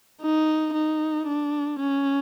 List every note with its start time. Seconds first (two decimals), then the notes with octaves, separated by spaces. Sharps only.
0.22 D#4
0.74 D#4
1.27 D4
1.79 C#4